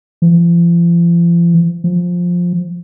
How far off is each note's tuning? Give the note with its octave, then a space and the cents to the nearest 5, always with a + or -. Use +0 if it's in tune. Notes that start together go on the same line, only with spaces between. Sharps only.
F3 -40
F3 +10